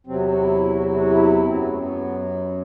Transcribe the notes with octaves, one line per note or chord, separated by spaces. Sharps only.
E2 C3 F#3 C4
B3
C4
F#4
E4
F#4
E4
F#4
E4
F#2 F#3 C4
B3
A3
B3